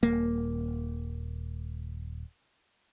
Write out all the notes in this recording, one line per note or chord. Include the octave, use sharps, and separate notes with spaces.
D#1 A#3